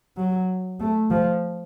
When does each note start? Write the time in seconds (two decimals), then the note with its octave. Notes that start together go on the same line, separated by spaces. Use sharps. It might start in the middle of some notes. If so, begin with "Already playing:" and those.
0.16 F#3
0.80 A3
1.10 F3